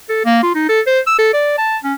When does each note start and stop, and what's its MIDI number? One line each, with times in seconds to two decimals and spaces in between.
0.09 0.25 69
0.25 0.38 58
0.43 0.51 65
0.55 0.69 63
0.69 0.80 69
0.87 1.00 72
1.07 1.18 88
1.19 1.30 69
1.33 1.57 74
1.58 1.77 81
1.84 1.94 61